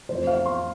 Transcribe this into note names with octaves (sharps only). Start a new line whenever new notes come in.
F2 E3 A3 C5
F5
C6